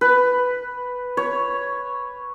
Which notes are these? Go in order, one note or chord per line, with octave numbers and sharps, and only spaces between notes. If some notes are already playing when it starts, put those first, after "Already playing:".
B4
C#5